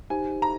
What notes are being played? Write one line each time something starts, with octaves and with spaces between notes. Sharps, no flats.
D#4 G4 C5 G#5
A#5